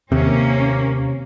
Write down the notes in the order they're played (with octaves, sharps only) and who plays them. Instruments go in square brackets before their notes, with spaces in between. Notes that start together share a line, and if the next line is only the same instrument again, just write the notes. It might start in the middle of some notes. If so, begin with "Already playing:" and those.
[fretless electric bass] D#2 [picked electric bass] C3 [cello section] A#3 C#4